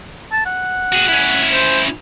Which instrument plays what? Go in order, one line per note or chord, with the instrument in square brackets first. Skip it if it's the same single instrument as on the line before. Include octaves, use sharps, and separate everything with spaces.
[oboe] A5
F#5
[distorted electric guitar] F#4 G#4
C#4 E4
[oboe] C5